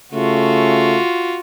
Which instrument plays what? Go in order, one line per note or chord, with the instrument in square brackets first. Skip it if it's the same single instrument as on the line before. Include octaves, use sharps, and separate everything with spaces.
[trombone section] C#3 A3 [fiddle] F4 F#4